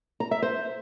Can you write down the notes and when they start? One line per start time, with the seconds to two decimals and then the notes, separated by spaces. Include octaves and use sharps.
0.20 A#5
0.31 E5
0.42 C5